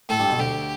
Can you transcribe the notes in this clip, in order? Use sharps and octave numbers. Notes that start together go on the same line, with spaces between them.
A2 A3 A4
G2 G3
B1 B2
D2 D3 G4